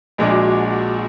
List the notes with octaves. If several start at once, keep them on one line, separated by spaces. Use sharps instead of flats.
A#1 A#2 G#3 D4 F#4